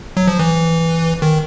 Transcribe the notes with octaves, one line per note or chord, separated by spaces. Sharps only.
F#3
F3
E3
D#3